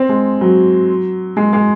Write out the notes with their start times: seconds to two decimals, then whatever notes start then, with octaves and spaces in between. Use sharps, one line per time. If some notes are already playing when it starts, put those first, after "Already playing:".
Already playing: C4
0.09 G#3
0.41 F#3
1.37 G#3
1.53 G#3